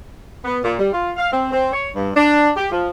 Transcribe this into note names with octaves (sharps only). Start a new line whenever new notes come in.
B3
A#2
G3
F4
F5
C4
C4
C#5
G2
D4
G4
F3